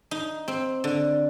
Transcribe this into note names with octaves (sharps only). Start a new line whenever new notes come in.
D#4
C4
D3